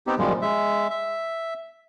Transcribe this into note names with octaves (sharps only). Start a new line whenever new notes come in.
B3 C4 D#4 G4
F#2 A#2 D#3 F3 G3 G#3
G#3 E5
E5